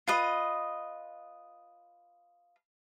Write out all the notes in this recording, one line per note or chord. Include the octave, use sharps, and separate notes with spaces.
F4 B4 D#5